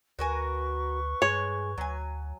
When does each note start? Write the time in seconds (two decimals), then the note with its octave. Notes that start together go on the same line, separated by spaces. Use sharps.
0.19 D2 F#4 A#4 B4 G#5 C#6
1.22 G2 G#3 C#5
1.78 D2 F#3 G#5